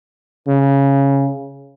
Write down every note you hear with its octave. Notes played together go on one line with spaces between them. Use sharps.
C#3